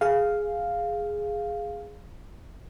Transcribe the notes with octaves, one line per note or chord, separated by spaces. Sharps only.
G#4 F5